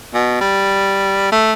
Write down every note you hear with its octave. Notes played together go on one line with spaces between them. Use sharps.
B2
G3
A3